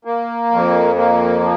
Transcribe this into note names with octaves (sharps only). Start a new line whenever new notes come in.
A#3
F2
A#3
F3